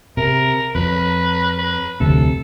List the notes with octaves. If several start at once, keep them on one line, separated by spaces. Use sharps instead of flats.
C3 A#4
F2 B4
B4
F1 D2 C3 A4